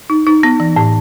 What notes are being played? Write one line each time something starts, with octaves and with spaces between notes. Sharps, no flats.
D#4
D#4
B3
E3
A2